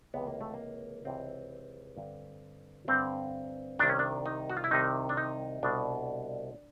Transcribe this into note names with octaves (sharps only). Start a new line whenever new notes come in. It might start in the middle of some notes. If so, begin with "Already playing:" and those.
C#2 C3 E3 B3
A#3
A3
A#3
C#2 C3 E3 C4
G2 D3
G2 D3 C4
C2 C3 D#3 D4
C#4
D4
D#4
F#4
F4
E4
C2 C3 D#3 D#4
D4
D#4
C2 B2 D4